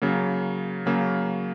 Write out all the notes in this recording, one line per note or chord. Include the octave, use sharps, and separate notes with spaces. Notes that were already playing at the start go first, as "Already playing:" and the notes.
C#3 F#3 A#3
C#3 F#3 A#3